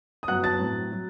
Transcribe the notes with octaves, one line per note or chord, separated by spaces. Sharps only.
D#6
G1 F#2 F#3 F#5 F#6
A5 A6
A2 F#3 C4
F#3